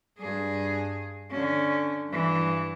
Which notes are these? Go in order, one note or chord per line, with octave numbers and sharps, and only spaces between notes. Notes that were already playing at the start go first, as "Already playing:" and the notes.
G2 G#4
D3 C#4
G2 E3